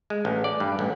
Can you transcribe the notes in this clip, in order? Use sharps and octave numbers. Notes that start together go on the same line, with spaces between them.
G#3
A1
D5
G2
A1